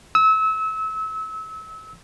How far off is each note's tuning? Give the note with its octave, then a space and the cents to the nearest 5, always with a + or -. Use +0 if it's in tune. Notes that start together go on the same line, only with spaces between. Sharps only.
E6 -30